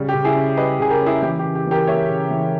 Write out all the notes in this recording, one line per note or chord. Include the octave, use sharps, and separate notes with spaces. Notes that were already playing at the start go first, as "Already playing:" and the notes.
Already playing: C#3 G3
G4
C#3
E4 G#4
C#4
G3 B4 D#5
C#3 G#4
G4 A#4
C#4
E4 G#4
E3 G4
G4
C#3
G4
E3 G4 A#4
A#3 C#5 E5
C#3
E3